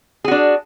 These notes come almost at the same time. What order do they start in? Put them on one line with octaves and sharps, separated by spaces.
G#4 F#4 D4